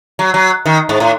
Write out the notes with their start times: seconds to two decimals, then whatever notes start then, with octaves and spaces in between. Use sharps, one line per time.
0.19 F#3
0.34 F#3
0.66 D#3
0.89 G#2
1.00 A2